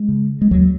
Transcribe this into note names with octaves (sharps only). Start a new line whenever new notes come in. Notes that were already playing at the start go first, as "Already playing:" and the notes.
Already playing: G#3
C#3
G#3
D#2 F#3